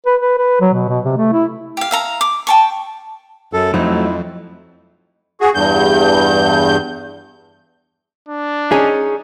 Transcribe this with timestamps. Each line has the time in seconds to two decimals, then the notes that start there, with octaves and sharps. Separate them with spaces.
0.06 B4
0.21 B4
0.38 B4
0.61 F#3
0.73 B2
0.89 B2
1.05 C3
1.17 A3
1.33 E4
1.77 G4 F5
1.91 E5 F5 A#5
2.21 D6
2.47 G5 A5 C#6
3.53 F#2 A4
3.74 F2 F3 F#3 A3 D#4 E4
5.41 F#4 G#4
5.55 E2 G2 G6
8.28 D4
8.72 C#4 D#4 G#4